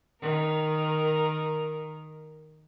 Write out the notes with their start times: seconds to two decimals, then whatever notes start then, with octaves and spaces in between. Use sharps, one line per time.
0.22 D#3 A#4